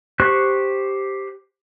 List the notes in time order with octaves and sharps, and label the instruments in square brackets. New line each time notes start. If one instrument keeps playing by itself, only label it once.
[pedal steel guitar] G4 C5 C#6 F#6